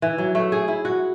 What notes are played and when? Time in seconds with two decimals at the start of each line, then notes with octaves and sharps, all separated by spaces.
0.02 E3
0.18 F#3
0.35 A3
0.52 G#4
0.68 E4
0.85 F#4